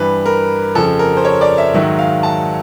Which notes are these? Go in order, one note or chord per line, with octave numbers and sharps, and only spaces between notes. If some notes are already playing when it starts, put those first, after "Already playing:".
Already playing: G2 E3 B4
A#4
F2 C#3 F3 A4
A#4
C5
C#5
D5
E5
G#2 D#3 F#3 E5
F5
A5